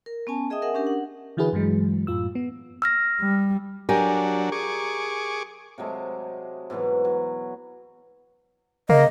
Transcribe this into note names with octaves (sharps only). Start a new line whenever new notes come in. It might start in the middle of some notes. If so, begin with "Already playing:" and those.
A#4
B3 C#4 G#5 A5
G#4 D#5 E5 G5 D#6
A#4 E5 F#5 G#5
C#4 D4 G4 A#4
F#5
D3 E3 E4 F#4 G#4 B4
G2 E3 F#3 G#3
F#2 A2 F4 E6
B3
E6 F6 A#6
G3
F#3 D4 G4 A#4 G#5
G#4 C#6 D6
C3 F#3 G#3 A3
G#2 B2 E3 F#3
F#3
C#3 A#3 D#5